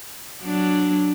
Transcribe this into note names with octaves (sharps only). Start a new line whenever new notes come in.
F#3 D4